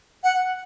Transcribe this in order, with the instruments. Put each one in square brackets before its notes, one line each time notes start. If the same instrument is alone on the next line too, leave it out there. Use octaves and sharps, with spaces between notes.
[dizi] F#5